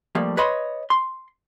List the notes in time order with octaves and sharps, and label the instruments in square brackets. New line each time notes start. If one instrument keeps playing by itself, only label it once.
[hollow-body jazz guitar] F3 G3 A3 A#3
B4 C#5 D#5 B5 C6
C6